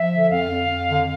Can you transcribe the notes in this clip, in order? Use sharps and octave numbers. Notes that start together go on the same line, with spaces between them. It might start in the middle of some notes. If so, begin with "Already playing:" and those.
Already playing: F3 E5
D3
F2 F5
F2
F2
D3